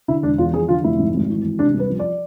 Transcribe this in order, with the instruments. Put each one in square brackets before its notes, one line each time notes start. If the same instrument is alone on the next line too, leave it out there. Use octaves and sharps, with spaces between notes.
[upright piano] D3 E4
E1 D4
E2 F4
F3 G#4
D3 F4
F1 E4
G#2
G#1
E3
G#1
C3 D4
C2 B4
F3
D5